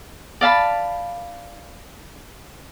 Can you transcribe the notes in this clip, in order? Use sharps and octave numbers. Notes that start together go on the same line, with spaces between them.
D5 F5 A5 B5